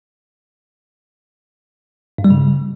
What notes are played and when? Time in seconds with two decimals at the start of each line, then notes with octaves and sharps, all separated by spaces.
2.18 G2
2.24 G3
2.31 C#3